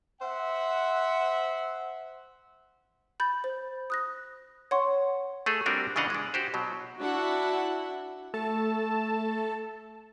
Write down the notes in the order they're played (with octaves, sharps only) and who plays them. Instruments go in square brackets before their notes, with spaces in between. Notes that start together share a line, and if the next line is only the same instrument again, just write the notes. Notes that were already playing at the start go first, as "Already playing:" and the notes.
[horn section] C5 E5 F#5
[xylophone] B5 G6 A6
C5
D#6 F#6 A#6
C#5 F#5 C6 C#6
[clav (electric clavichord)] A3 G#4 A4
G3 C4 D4 F#4 G4 A#4
C#3 E3 D4 D#5 F5 F#5
G#3 D4
F#4 G4 C5
B2 F#3
[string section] D4 E4 F#4 E5 F#5
[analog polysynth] A3 A4 A5